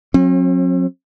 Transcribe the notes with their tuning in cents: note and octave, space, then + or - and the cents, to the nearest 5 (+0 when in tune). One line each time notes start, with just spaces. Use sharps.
F#3 -30 C4 +45